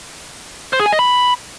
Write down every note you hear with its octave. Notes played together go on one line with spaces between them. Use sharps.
C5
G#4
G#5
D#5
B5